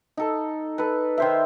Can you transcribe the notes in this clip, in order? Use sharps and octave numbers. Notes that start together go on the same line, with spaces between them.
D#4 A4
A4 B4
D#3 C5 E5